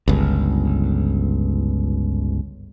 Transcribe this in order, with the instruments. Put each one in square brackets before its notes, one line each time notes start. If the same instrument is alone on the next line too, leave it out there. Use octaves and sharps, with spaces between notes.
[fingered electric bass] G1 C#2